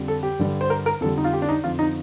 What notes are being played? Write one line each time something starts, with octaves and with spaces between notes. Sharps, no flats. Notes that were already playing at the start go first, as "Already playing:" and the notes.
Already playing: F2 D3 G3
A4
G4
G2 D3 G3
C5
A#4
A#4
F2 D3 G3 A4
D#4
F4
G4
D4
D#4
F2 D3 F3 F4
D#4